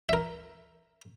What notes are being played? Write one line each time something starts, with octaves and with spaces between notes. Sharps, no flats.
A#4 E5